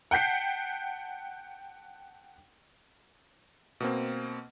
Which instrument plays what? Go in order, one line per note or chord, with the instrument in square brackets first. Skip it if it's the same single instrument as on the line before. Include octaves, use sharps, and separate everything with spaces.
[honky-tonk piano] F#5 G5 A5 G6 B6 C7
[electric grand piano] B2 A#3 C4